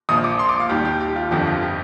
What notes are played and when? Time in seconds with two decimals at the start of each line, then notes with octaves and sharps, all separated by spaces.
0.09 A#1 A#2 F3 D#6
0.24 D6
0.39 C6
0.49 D6
0.60 F5
0.69 D#2 D#3 G3 G4
0.85 G4
1.00 G4
1.16 F4
1.31 G1 F2 D3 F3 G4
1.47 F4
1.62 G4